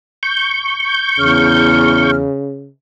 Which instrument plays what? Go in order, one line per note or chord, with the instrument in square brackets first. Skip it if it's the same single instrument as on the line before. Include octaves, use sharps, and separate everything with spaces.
[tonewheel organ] C#6 G6
[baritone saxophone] E2 [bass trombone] C#3 [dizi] F6